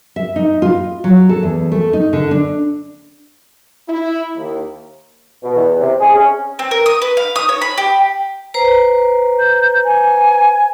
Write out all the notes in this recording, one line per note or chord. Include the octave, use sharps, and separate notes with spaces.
E5
D#4
F4
F#3
A4
E2
A3
D#4
D3
D4
E4
D#2
B2
E2
C3
G#4
C#4
C4
A#4
D#6
B4
F5
D#6
C#5
B5
G4
B4 C5 A#5
G6
G#5